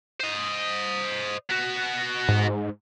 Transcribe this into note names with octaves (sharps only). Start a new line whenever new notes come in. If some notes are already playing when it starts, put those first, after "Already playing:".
C5 D#5
B3 F#4
G#2